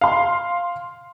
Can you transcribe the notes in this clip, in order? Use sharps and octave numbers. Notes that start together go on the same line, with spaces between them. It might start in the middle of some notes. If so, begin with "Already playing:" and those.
F5 C6